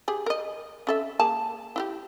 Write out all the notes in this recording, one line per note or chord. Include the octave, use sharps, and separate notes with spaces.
G4 G#4
A#4 D#5
C#4 A4 E5
A#3 G#4 A5
E4 F#4 G4